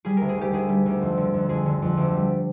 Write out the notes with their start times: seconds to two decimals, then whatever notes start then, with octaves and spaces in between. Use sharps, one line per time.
0.05 G3 G#4
0.17 D2 A#4
0.29 G#4
0.38 D2 G4
0.53 D2 G#4
0.69 G3
0.86 D2
1.01 F2
1.17 D3
1.34 F2
1.49 F2 G#4
1.66 D3
1.82 F2
1.97 D2
2.14 G3